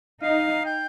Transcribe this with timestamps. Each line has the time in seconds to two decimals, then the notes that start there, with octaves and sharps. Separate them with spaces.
0.22 D#4 F5
0.66 G5